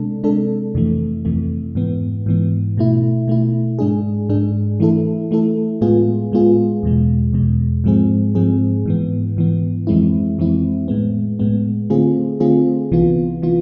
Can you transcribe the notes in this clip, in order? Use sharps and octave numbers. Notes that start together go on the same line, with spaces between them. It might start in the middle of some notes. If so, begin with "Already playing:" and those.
Already playing: C3 G#3 D4 A4
C3 G#3 D4 A4
F2 C3 E3 A3
F2 C3 E3 A3
G#2 E3 B3
G#2 E3 B3
B2 A3 E4
B2 A3 E4
G#2 G#3 D4 G#4
G#2 G#3 D4 G#4
E3 A3 E4 A4
E3 A3 E4 A4
A2 G#3 B3 F4 G#4
A2 G#3 B3 F4 G#4
E2 B2 G#3
E2 B2 G#3
G#2 F3 G#3 C4 G#4
G#2 F3 G#3 C4 G#4
G#2 E3 B3
G#2 E3 B3
F2 E3 G#3 C4 E4
F2 E3 G#3 C4 E4
A2 G#3 B3
A2 G#3 B3
D3 A3 C4 F4 G#4
D3 A3 C4 F4 G#4
C2 C3 E3 B3 F4
C3 E3 B3 F4